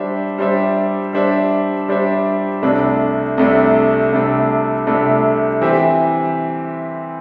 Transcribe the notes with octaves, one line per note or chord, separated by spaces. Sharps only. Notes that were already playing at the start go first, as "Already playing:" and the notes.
Already playing: G3 D4 C5 E5
G3 D4 C5 E5
G3 D4 C5 E5
G3 D4 C5 E5
C2 C3 A3 D4
C2 C3 A3 D4
C2 C3 A3 D4
C2 C3 A3 D4
E3 C4 G4 E5